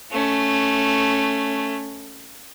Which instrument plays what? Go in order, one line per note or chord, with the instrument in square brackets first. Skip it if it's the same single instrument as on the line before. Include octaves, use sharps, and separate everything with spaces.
[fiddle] A3 C#4